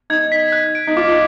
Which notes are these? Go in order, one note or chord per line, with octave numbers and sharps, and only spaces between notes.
D#4 G#6
B6
F#6
D7
D#4
F4 D6